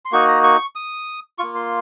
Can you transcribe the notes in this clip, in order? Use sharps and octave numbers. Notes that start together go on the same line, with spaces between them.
C6
A#3 D#4 F#4 C#6
A#5
C#6
D#6
A#3 F4 C#6
C6